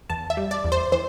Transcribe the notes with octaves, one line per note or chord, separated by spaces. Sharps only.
E2 A5
E5
G3
D5
E2
C5
E3 C5